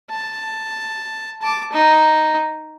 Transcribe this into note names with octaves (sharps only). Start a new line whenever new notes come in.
A5
A5 D6
D#4